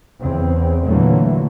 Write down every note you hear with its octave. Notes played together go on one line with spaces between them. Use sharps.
E2 C#3 C4
A#2 D3 E3 F#3 A3 A#3